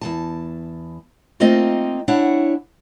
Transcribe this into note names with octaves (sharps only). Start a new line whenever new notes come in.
E2 G2 A5
A3 A#3 C4 D#4 F4 D#5
D4 E4 C#5 F#5